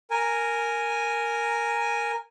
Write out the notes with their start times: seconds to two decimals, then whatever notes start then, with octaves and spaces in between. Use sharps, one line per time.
0.11 A#4 G#5